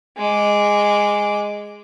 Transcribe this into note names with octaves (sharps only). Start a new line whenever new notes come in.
G#3 D6